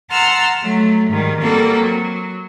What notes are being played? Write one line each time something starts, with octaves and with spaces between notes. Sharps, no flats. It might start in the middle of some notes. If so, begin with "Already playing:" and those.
F#5 A5 A#5 C6 E6 F6
F#3 A3
G#2 D#3 G3
G3 A#3 C4 F#4 A4
F#3